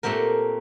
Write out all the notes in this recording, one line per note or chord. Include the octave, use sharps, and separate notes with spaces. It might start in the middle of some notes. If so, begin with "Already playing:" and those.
A#2 A3 C4 G4 A#4